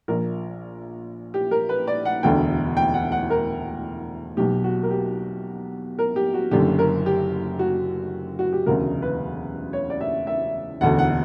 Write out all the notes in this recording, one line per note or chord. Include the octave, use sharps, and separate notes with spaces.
A#1 A#2 A#4
G4
A#4
B4
D5
F#5
E1 D2 D3 G5
G5
F#5
F#5
A#4
B1 B2 G4
F#4
A#4
G4
A#4
G4
F#4
F#1 F#2 D3 G4
A#4
G4
F#4
F#4
G4
E1 D2 C#3 A#4
B4
C#5
D5
E5
E5
E1 D2 D3 F#5
F#5